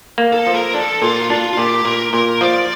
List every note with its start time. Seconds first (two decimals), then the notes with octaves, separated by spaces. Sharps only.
0.18 A#3
0.33 A4
0.47 F3
0.54 A#4
0.74 D4 A4
1.02 A#2 F4
1.30 D4 F4
1.53 F4
1.57 A#2 G4
1.85 A#2 A#4
2.13 A#2 A#4
2.41 F3 D5